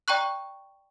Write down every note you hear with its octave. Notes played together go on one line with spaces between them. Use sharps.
D5 G5 A#5 C#6 F#6